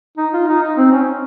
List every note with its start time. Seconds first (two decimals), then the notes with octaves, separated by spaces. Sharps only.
0.18 D#4
0.33 F4
0.48 D#4
0.62 D#4
0.77 C4
0.92 C#4